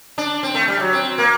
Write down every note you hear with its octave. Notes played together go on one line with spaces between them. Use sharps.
D4
C4
A3
G3
F#3
C4
A#3